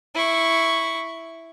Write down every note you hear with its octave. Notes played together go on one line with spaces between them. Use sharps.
E4 C#6